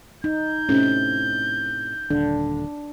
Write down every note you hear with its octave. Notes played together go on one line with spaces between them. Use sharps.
D#4 G6
A2 C3 C#4
D#1 D3 D4